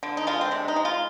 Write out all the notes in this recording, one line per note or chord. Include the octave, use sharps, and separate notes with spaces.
D3
D#4
G#3 F4
C4
C3 D4
D#4
G#3
F4